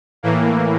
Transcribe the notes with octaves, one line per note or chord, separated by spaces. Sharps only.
A2 E3 A#3